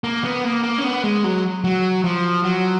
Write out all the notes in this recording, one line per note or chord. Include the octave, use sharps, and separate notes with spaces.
A#3
B3
A#3
A#3
C#4
B3
G#3
F#3
F#3
F3
F#3